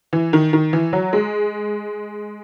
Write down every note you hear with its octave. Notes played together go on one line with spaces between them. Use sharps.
E3
D#3
D#3
E3
F#3
G#3